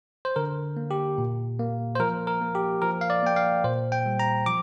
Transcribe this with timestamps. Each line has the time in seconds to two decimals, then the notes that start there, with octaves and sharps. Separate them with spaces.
0.25 C5
0.36 D3 A#4
0.77 A#3
0.91 G4
1.18 A#2
1.59 A#3
1.95 C5
2.00 F3 A#4
2.27 A#4
2.41 A#3
2.55 G4
2.82 F3 A#4
3.01 F5
3.10 D5
3.23 A#3 G5
3.36 F5
3.64 A#2 C5
3.92 G5
4.06 G3
4.19 A#5
4.46 F3 D6